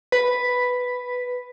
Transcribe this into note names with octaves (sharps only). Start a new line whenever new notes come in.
B4